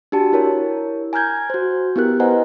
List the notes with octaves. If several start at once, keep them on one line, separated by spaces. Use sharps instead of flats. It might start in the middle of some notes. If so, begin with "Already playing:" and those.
D4 F#4 G4 A5
E4 A#4 C#5
G#5 A#5 F6 G6 G#6
F#4 C5
B3 E4 G4 A#4 F#6
B4 C5 D#5 F#5 G#5 A#5